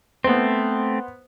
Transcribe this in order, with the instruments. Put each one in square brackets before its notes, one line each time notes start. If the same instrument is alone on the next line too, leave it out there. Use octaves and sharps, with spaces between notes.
[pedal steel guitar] A3 C4 [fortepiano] B3 C5